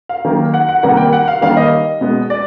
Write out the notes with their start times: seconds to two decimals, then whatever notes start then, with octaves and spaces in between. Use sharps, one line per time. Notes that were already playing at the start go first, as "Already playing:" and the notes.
0.09 F5
0.25 D#3 F#3 A#3
0.54 F#5
0.69 F#5
0.83 C3 D#3 G3 A#3 F#5
0.97 G5
1.13 F#5
1.28 F5
1.41 D#3 G3 A#3 F5
1.57 D#5
2.01 B2 G#3 B3
2.30 D5